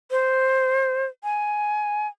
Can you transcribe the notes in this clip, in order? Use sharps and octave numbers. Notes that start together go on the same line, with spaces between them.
C5
G#5